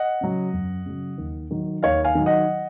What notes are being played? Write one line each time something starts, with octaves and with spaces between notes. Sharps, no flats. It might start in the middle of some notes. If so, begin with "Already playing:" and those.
Already playing: D#5 F#5
C#3 F#3
F#2
C#3 F#3
D#2
D#3 F#3
D#2 C#5 F5
F5 G#5
D#3 F#3
D#5 F#5